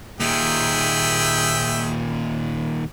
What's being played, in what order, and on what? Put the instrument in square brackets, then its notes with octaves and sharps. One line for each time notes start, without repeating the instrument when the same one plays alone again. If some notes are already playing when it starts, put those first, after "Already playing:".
[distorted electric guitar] D#2 A#2 [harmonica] G#4 E5 G5